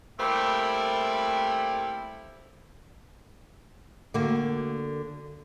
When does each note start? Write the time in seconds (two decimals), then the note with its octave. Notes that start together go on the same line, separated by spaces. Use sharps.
0.18 G3 A3 A#3 C4 E4
4.14 D3 A#3 F#4